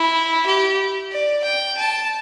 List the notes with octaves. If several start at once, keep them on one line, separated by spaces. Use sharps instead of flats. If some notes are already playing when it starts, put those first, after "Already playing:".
Already playing: E4
G4
D5
G5
A5